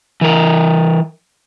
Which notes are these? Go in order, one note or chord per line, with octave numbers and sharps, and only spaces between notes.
E3 A#4